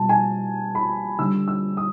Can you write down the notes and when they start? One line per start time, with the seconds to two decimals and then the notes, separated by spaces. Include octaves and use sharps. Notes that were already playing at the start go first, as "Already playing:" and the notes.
Already playing: B2 G3 A5
0.09 G#5
0.75 B5
1.19 D3 G3 E6
1.48 E6
1.77 D#6